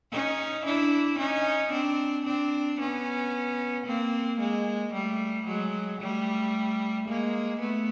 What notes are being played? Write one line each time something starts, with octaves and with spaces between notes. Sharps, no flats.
C#4 D#4
D4 E4
C#4 D#4
C4 D4
C4 D4
B3 C#4
A#3 C4
G#3 A#3
G3 A3
F#3 G#3
G3 A3
G#3 A#3
A3 B3